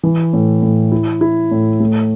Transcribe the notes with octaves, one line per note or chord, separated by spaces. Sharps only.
E3
A2
A2
E4
E4
A2
A3